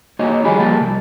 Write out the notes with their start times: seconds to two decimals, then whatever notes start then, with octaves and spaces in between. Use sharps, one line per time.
0.19 A#3 D#4 F#4 G#4 C#5 D#5
0.45 D#3 F3 G3 F4 G#4 B5
0.59 F3 G3 A3 A#3 A#4 A5
0.80 C2